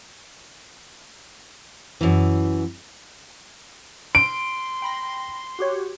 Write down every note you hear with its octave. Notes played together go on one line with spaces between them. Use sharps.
F#2 E3
C6 D7
G5 B5 A#6
F#4 G4 C#5